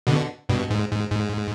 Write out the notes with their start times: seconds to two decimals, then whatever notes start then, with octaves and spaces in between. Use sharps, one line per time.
0.07 B2 D3
0.49 G2 B2
0.70 G#2
0.91 G#2
1.11 G#2